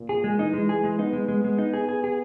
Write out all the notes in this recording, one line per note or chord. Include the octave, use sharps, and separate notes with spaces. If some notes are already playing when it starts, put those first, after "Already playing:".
Already playing: A#2
G#4
G#3
E3 D#4
G#3
G#4
G#3
B3 D#4
G#3
G#3
G#3
D#4
G#4
G#4
G#4